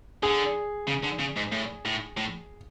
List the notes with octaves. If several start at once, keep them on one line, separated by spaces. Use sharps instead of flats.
D3 G#4
C#3
D3
C#3
G#2
A2
A2
A2